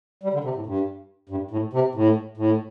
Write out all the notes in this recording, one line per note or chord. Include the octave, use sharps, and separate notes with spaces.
G3
D3
C3
A2
G2
G2
A2
C3
A2
A2